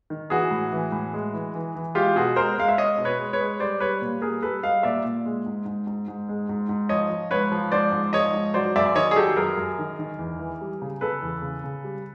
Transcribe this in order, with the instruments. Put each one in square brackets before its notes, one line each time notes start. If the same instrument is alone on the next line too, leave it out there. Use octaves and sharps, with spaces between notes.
[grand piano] D#3
E3 F#4 G#4
A2
E3
A2
G#3
E3
E3
E3
G#3 F4 G4
B2 F#4 G#4
G#3 A#4 C5
G#3 F5
E5
G#3 C#5 D#5
B2
B4 C#5
G#3
B4 C#5
G#3
G3 C5 D5
G3 B4 C#5
A#2
G3 G#4 A#4
G3 A4 B4
G3 D#5 F5
A#2 D5 E5
A#2
G#3
G#2
G#2
G#2
G#2
G#3
G#2
G#2
F3 C#5 D#5
F3
G#2 B4 C#5
F3
G#2 C5 D5
G#2
F3 C#5 D#5
G#2
F#3 C5 D5
F#2 D5 E5
E5
D#3 C#5 D#5
G#4
F#3 G4 A4
F#2 G#4 A#4
F#2
D#3
D#3
E2
E3
G3
C#3
C#3 A4 B4
E2
C#3
C#3
G3